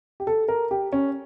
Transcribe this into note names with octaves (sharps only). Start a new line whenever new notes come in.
G4
A4
A#4
G4
C#4